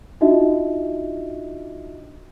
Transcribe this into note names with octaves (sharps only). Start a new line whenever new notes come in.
D4 D#4 F4 F#4 D#5 E5